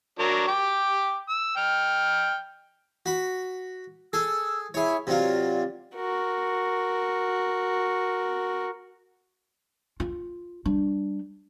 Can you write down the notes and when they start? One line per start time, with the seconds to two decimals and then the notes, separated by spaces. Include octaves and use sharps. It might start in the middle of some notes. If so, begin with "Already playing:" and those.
0.19 F#3 D4 A#4
0.48 G5 D6
1.29 E6
1.57 G5 F6
3.06 F#4 B5
4.13 G#4 A4 E6
4.74 E4 G#4 C#5
5.07 C3 F#3 F4 D5
5.96 F#4 A#4
10.00 F4
10.65 G3 D4